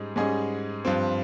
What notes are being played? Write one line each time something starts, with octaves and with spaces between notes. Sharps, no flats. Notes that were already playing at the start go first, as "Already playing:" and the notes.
Already playing: G#2 G3 C#4 G#4 D#5
G#2 G3 C#4 G#4 D#5
G2 F3 C4